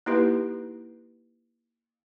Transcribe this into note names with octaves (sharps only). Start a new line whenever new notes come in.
A#3 D#4 E4 G4 B4